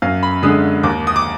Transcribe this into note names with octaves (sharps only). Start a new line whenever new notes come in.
F#2 F5
B5
D3 G#3 D#6
D#2 D6
D#6
D6